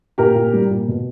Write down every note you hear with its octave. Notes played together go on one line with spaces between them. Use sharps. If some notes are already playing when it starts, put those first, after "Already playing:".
A#2 G4 A#4
A#2
G3
A#2
B2